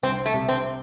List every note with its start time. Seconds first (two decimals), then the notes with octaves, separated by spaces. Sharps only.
0.03 C2 C4
0.26 A3
0.34 C3
0.49 C4